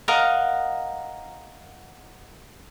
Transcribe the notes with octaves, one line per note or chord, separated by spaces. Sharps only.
A#4 D#5 F5 F#5